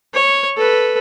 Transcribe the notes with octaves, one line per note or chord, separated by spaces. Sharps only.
C#5
A4 B4